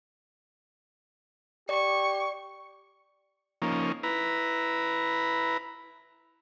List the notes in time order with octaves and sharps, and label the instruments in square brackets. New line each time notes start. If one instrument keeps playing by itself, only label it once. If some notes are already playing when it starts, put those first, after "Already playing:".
[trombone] G4 [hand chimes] D5 [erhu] C#6
[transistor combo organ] F3 A#3 C#4 D#4
E4 B4 A#5